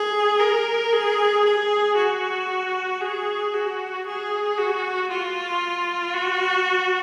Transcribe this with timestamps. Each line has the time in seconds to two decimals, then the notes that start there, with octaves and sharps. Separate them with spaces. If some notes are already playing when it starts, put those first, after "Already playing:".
Already playing: G#4
0.40 A#4
0.93 G#4
1.45 G#4
1.96 F#4
3.02 G#4
3.54 F#4
4.06 G#4
4.58 F#4
5.10 F4
6.15 F#4